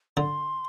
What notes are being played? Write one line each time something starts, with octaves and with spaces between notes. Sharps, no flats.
D3 C6